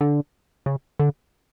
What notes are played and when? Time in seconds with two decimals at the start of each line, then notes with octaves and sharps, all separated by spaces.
0.01 D3
0.66 C#3
1.00 D3